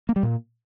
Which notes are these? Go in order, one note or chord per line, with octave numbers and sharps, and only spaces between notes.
A#3
G3
A#2